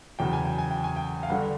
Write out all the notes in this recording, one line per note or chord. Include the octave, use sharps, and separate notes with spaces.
E2 C#3 F#3 G5
G#5
G5
G#5
G5
G#5
G5
F5
G1 G2 D3 F#5